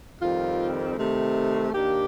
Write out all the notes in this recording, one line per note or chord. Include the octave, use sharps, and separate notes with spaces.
F2 D#3 G3 C4 F4
C3 D#3 A3
D#2 D#3 A#3 D4 G4